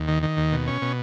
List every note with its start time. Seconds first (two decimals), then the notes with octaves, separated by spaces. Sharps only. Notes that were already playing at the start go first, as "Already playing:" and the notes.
Already playing: D#2
0.08 D#3
0.23 D#3
0.37 D#2
0.52 B2
0.67 C#4
0.82 B2